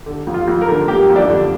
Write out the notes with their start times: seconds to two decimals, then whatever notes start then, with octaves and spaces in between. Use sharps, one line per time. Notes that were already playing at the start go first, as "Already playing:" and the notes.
0.06 D3
0.27 F2
0.34 F4
0.48 F2
0.61 A#4
0.68 D3
0.88 A#3 G4
1.09 F2
1.16 D4
1.29 D3